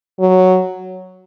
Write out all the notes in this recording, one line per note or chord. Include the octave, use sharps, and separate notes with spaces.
F#3